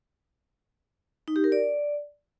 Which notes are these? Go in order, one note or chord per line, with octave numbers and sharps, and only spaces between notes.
D#4
G4
A#4
D5